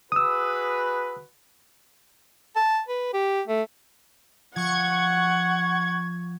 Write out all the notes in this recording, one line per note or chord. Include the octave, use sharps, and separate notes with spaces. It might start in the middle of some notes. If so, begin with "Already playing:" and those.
F#4 G#4 B4 D#6 E6
A5
B4
G4
A3
F3 F#5 C#6 G#6